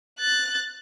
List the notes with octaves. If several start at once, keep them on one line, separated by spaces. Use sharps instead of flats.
F#6 A6